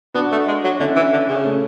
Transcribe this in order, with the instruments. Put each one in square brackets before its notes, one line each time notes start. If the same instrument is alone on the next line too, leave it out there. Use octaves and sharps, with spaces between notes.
[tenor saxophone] B3 [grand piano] D4 F#4
[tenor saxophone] A3
G#3
F#3
[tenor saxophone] D3 [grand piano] C#4 E4
[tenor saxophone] E3
D3
C#3
[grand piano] A3 C#4